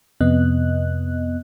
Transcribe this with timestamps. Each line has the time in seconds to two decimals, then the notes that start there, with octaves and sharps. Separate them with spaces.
0.21 F2 C3 B3 D#5 F#6